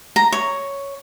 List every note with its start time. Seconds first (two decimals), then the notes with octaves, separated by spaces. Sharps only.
0.16 A#5
0.32 C#5